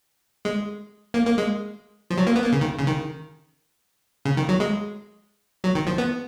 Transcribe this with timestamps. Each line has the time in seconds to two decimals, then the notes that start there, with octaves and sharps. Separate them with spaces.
0.45 G#3
1.14 A#3
1.26 A#3
1.38 G#3
2.10 F3
2.18 F#3
2.27 A#3
2.36 B3
2.44 A#3
2.52 C#3
2.61 D#3
2.79 C#3
2.87 D#3
4.25 C#3
4.37 D#3
4.49 F#3
4.60 G#3
5.64 F#3
5.75 D#3
5.87 F3
5.98 B3